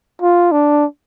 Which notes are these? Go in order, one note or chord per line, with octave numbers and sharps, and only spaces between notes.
F4
D4